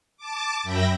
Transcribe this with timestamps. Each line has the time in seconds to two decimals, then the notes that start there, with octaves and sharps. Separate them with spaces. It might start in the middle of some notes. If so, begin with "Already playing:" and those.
0.17 A5 D6
0.63 F#2 E5 G5 B5 A#6